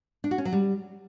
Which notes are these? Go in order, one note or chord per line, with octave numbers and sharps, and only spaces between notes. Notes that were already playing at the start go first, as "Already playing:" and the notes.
D4
F#4
C#4
F#3
G3